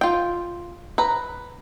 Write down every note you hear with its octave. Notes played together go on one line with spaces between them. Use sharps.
F4 G5
B4 A#5